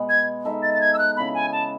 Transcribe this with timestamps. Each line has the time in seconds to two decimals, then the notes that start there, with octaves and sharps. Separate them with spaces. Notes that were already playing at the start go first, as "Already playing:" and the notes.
Already playing: B2 G#3 B3
0.09 G#6
0.45 G#3 D#4 A4 E5
0.63 A6
0.74 A6
0.81 G#6
0.94 E6
0.99 F#6
1.17 C#3 E3 B3 B5
1.34 G#5
1.52 A5